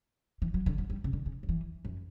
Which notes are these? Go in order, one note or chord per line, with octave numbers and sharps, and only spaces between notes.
E3
F#3
D3
F#3
G3
C#3
D3
C#3
F#3
E3
F#2